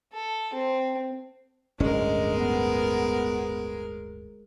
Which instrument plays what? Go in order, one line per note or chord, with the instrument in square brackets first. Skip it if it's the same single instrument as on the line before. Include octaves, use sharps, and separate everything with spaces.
[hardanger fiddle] A4
C4
[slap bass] D1 G1 C#4 [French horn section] D3 D#5 [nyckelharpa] G#3 A#4
[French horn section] B3